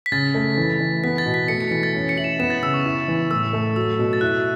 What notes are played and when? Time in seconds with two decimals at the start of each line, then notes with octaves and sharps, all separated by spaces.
0.06 B6
0.12 C#3 A6
0.34 A3
0.57 E3
0.81 E3
1.03 B3 B6
1.18 A6
1.26 B2
1.34 B6
1.48 A3 C#7
1.61 C#7
1.71 E3 C#7
1.83 A6
1.94 C#4
2.09 C#7
2.17 E4 F#7
2.24 E7
2.39 B3 E7
2.50 A6
2.63 C#3 E6
2.74 C#6
2.85 E4
3.08 E3
3.31 A2 E6
3.53 A3
3.76 F#3 E6
3.99 B2
4.13 A6
4.21 E4 F#6